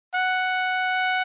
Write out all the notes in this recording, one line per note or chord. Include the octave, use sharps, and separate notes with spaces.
F#5